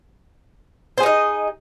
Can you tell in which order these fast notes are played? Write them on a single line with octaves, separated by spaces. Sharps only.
C5 G#4 D#4 D#5